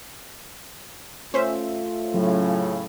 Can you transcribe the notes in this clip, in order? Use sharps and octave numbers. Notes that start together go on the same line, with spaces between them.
A3 C#4 F4 C5 E5
A2 C#3 F#3